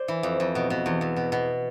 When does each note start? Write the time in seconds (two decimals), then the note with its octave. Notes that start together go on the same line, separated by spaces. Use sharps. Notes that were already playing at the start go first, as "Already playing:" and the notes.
Already playing: C5 D5
0.08 E3
0.23 F2
0.40 F2
0.55 B2
0.70 B2
0.86 E2
1.01 E2
1.16 B2
1.32 B2